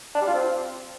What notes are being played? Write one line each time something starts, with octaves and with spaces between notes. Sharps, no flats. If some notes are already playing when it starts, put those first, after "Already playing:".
D4
G3
F4
C4